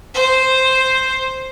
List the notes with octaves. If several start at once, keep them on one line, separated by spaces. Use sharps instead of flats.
C5